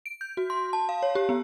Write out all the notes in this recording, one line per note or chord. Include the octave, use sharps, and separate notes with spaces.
D7
G6
F#4
C6
A5
F5
C#5
G4
B3